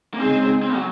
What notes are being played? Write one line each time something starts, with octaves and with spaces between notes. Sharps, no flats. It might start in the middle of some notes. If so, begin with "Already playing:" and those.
A#3
C#3 G#3 C4 D#4 G#4
C4
F#3